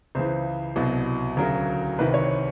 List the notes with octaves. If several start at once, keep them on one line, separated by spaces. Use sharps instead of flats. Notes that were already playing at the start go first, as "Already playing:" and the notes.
C#2 C#3 E3 C5
C2 B2 F#3
D2 C#3 F#3 A#4
C2 C3 D#3 B4
C#5